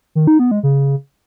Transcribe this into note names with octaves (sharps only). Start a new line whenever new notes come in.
D#3
D#4
B3
G#3
C#3